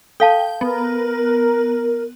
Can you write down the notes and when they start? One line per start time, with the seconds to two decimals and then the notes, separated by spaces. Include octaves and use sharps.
0.20 A4 F5 G5 A5
0.61 B3 A#4